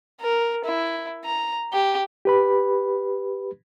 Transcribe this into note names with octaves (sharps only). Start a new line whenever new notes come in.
A#4
E4
A#5
G4
G4 B4 B5